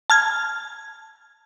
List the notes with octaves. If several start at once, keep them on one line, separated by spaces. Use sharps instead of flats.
A5 F6 G#6